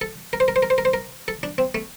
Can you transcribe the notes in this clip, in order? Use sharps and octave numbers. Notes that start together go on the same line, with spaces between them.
A4
A#4
C5
A#4
C5
A#4
C5
A#4
C5
A#4
A4
D4
C4
A3